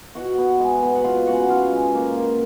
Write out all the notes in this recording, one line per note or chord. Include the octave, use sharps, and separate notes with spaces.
B2 F#4 F#5
B3
G#3
B3
F#5
B3 F4 F5
C#3 F#4 F#5
B3 F4 F5
G#3
A#3
A#3